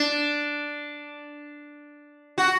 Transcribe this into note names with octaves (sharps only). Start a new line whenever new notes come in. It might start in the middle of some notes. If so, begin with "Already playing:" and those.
Already playing: D4
F#4